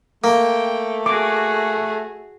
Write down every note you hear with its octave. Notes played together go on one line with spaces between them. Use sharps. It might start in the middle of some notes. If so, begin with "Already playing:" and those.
A3 A#3 G5
F#4 G#4 D6